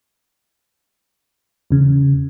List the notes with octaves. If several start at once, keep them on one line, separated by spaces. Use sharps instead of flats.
E2 C#3